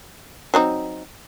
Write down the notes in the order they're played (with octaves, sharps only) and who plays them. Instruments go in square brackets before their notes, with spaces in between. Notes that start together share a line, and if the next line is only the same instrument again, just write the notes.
[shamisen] F#3 C4 D#4